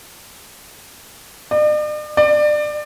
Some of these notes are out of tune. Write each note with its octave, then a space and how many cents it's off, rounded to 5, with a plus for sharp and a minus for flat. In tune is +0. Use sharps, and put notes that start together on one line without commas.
D5 +45
D5 +25